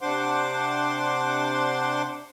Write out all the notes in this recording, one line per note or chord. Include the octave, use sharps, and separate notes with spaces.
C3 D4 C5 F#5 C6 D6